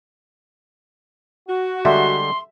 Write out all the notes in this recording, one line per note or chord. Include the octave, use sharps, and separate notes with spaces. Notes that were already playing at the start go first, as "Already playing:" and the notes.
F#4
D3 G3 G#3 E5 C6